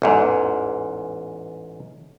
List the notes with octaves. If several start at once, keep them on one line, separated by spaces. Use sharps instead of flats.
A1 E2 G#2